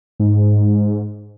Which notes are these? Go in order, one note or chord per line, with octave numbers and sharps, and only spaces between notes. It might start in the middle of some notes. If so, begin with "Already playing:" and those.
G#2